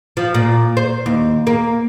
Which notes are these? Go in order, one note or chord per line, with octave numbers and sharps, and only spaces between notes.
F3
A#2
C5
D#2
A#3